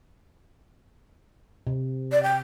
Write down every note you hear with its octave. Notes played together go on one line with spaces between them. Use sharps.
C3
D5
G5